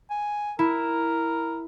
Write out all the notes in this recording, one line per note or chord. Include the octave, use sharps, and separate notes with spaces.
G#5
E4 A#4